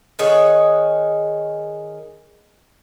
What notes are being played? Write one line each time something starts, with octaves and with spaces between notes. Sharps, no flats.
D#3 G#4 C#5 F#5